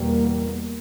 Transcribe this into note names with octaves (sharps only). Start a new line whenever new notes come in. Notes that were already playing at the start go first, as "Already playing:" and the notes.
Already playing: E2 B2 G3 A#3